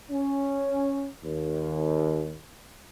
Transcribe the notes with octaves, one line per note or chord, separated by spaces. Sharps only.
C#4
D#2